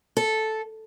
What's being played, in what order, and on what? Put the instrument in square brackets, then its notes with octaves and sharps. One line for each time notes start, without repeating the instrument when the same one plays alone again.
[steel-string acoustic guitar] A4